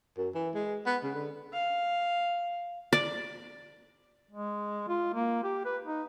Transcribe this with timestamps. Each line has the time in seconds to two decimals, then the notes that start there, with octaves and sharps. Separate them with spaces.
0.18 F#2
0.35 E3
0.55 G#3
0.86 B3
1.04 C#3
1.15 D3
1.53 F5
2.93 D5
4.31 G#3
4.88 F4
5.14 A#3
5.43 G4
5.65 B4
5.85 D#4